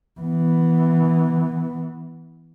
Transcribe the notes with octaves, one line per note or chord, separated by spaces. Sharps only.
E3 B3